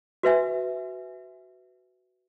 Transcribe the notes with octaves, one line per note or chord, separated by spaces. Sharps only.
F#4 B4 E5 G#5